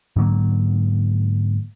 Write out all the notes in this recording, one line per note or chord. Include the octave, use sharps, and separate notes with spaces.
G#2 D3 F#3 A#3